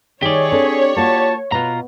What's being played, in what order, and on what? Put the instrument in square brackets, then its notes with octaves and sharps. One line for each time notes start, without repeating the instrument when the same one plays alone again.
[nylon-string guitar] D#3 D#4 [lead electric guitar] G4 D5 [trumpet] G#4 [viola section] C#5
[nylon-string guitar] C4 D4 A4
[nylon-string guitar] A#3 F4 F#4 [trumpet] A5
[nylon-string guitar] B2 [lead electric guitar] F4 A#5 [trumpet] B4